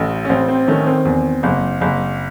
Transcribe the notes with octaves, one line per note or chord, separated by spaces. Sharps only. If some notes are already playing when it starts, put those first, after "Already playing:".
Already playing: A1 A3
C#4
A1 C4
C4
D#3 A3 C#4
C4
E2
F#1
F#1